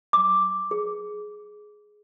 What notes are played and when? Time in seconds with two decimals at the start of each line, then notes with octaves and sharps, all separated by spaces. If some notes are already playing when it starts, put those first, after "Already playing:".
0.13 D6
0.71 G#4